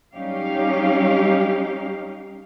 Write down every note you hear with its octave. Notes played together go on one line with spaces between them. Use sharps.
F#3 G3 C#4 D#4 G4 F5